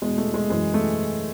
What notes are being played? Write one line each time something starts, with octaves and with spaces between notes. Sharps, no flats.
E2 B2 G#3
A3
G#3
F#2 E3 G#3
A3